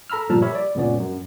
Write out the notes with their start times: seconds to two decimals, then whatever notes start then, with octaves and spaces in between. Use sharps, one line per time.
0.10 A4 A#5 B5 E6 F6
0.29 G1 A#2 F3 G3 A5 F6
0.42 G4 A#4 C#5 E5 B5
0.55 D5
0.75 C#2 F#2 A#2 B3 C#4 D5
1.00 F#2